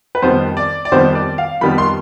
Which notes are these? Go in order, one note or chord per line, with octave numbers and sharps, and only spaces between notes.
B4
F2 D#3 G3 B3 C5
D5
D5
F2 D#3 G3 B3 C5
D5
F5
F2 D#3 G3 B3 B5
C6